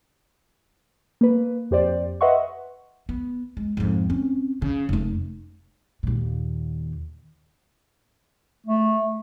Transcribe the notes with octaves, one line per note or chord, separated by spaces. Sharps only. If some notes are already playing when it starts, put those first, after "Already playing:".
A#3 B4
F2 G4 C5 D5
B4 D#5 E5 F#5 C6 C#6
B3
G#3
F2 G#2
C4 C#4
C#3
F1 A3
D#2 A#2
A3